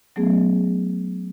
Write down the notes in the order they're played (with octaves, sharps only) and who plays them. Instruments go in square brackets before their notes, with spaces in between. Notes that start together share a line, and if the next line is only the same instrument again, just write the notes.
[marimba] F#3 A3 B3 C#4 G#4